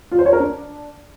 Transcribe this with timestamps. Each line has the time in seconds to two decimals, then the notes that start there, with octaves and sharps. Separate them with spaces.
0.12 F4
0.19 C5
0.26 C#5
0.33 A#4
0.40 D4